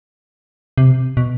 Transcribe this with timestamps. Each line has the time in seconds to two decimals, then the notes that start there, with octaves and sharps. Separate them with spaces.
0.78 C3
1.17 B2